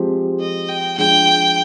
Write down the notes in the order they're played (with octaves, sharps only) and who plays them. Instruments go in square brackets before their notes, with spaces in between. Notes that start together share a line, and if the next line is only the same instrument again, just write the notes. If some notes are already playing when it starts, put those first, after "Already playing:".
Already playing: [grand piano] F3 G#3 C4 G4
[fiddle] D#5
G5
[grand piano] F3 G#3 D4 [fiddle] G5